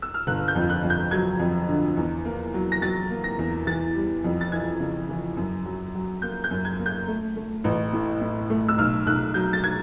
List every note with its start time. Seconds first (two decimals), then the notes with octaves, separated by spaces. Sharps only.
0.02 E6
0.14 F6
0.27 G1 F#6
0.48 G6
0.55 F2
0.70 F#6
0.83 F2
0.90 G6
1.11 F#3 G#6
1.39 F2
1.68 D3
1.97 E2
2.25 A#3
2.54 F#3
2.72 A#6
2.82 F#3 A6
3.10 A#3
3.24 A#6
3.39 E2
3.67 E3 A6
3.95 G3
4.24 F2
4.41 A6
4.52 E3 G#6
4.80 C#3
5.09 E3
5.37 F#2
5.65 F#3
5.95 F#3
6.22 A#3 G6
6.44 G6
6.51 F#2
6.65 G#6
6.79 A#3
6.86 G6
7.08 A3
7.36 A3
7.64 A1
7.93 A2
8.21 A2
8.50 A3
8.69 E6
8.78 B1 F6
9.07 B1 F#6
9.34 F#3 G6
9.53 A6
9.64 G#6